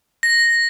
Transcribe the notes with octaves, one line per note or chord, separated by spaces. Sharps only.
A#6